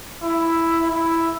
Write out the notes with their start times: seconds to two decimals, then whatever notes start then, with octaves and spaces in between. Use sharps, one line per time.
0.23 E4
0.90 E4